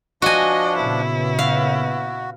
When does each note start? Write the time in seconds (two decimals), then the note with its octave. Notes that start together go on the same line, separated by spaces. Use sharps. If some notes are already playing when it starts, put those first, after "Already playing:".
0.22 F3 D4 F#4 D#5 G#5
0.76 A#2 C#3 B3 E4
1.39 F#4 F5